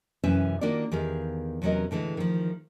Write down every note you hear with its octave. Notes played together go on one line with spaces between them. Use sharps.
F#2 C3 E3 C#4 B4 E5
D#3 A#3 D4 F4 F#4 D5
E2 D#3 G4 G#4 F5
E2 C3 F#3 C#4 A#4 D#5
A2 D3 E3 G#3
D#3 F3